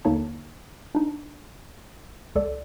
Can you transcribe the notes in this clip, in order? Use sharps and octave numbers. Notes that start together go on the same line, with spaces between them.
D#2 D3 A#3 D#4 C#5 A5
D4 D#4
C#2 A4 D5